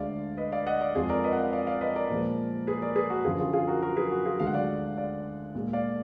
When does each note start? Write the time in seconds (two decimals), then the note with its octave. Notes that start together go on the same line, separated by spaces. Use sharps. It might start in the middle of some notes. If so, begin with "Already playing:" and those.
Already playing: D2 D3 G#3 D5 F5
0.37 B4 D#5
0.52 D5 F5
0.67 D#5 F#5
0.81 D5 F5
0.95 F2 F3 G#3 F4 G#4
1.09 A#4 D5
1.24 B4 D#5
1.33 F#5
1.38 D5 F5
1.53 D5 F5
1.67 D5 F5
1.81 B4 D#5
1.96 A#4 D5
2.10 A#2 F3 G#3
2.67 G#4 B4
2.82 A#4 D5
2.96 G#4 B4
3.10 F#4 A#4
3.25 F#2 D3 F3 F4 G#4
3.39 F4 G#4
3.53 F4 G#4
3.68 F#4 A#4
3.82 F#4 A#4
3.96 G#4 B4
4.11 F#4
4.25 F4 G#4
4.40 D2 D3 G#3 F5
4.47 F#5
4.54 D5 F5
4.97 D5 F5
5.55 A#2 G#3
5.73 D5 F5